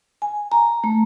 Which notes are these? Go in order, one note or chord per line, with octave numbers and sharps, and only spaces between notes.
G#5
A#5
A3